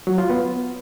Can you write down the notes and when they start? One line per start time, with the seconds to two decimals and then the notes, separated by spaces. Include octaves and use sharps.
0.07 F#3
0.18 F4
0.29 B3